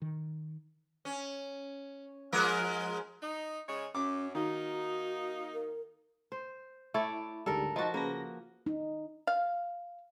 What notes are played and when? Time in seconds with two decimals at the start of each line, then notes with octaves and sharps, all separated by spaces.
0.02 D#3
1.05 C#4
2.32 F3 G#3 A#4
3.22 D#4
3.68 C#3 G#3 C#5
3.95 F#2 C#4 D6
4.35 D#3 A#3 D#4 F#4
5.54 A#4
6.32 C5
6.94 A3 E4 C#5 D5
7.46 D2 G#2 G3 A4 A#4
7.76 F3 D#4 F#4 A6
7.94 C#3 A#3 B4 A#6
8.66 D#4
9.27 F5